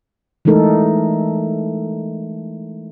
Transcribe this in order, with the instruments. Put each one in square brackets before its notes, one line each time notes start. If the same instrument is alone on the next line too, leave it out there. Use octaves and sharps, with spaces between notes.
[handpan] E3 G#3 A3 D#4 A4 A#4